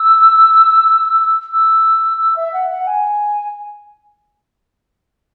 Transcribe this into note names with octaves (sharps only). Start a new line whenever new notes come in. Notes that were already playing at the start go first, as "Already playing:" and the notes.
Already playing: E6
E6
E6
E5
F#5
F#5
G#5